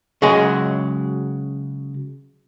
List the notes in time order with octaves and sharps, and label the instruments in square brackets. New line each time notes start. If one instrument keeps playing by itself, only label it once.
[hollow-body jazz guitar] C#3 F#3 G#3 G#4